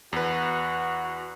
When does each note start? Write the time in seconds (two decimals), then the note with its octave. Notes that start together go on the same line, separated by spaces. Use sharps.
0.13 E2 F#4 B4